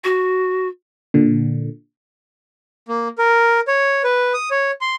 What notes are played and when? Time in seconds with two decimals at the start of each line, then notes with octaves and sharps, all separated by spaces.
0.04 F#4
1.14 A#2 D3
2.89 A#3
3.18 A#4
3.68 C#5
4.04 B4
4.34 D#6
4.51 C#5
4.81 C6